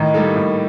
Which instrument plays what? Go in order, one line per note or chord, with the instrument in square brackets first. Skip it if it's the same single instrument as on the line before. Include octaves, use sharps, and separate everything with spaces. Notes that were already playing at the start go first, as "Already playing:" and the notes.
Already playing: [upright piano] A2 [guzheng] D#3
[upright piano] G3 A#3 D#4 A4
A2